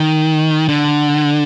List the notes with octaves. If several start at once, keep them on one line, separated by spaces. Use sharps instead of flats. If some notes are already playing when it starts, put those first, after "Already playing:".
Already playing: D#3
D3